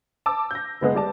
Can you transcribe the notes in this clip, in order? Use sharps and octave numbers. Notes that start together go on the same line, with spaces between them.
A5 D6 E6
G6 A#6
F#1 G#3 B3 G#4
G3 D5 A5